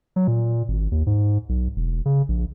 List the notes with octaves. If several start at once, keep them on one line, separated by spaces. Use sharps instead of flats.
F#3
A#2
G#1
D#2
G#2
B1
E1
C#3
A#1